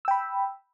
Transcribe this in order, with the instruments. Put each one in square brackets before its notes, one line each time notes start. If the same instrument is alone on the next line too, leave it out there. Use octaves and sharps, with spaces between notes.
[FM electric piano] E6
G5
B5